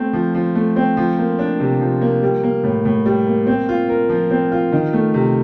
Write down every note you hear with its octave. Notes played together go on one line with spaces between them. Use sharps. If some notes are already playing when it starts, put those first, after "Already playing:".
Already playing: A3 C4
F3
F3
A3
C4
F3
A#3
D4
C3
F3
A#3
G3
A#3
A2
A2
G3
A#3
C4
F4
A#4
F3
C4
F4
D#3
A3
C3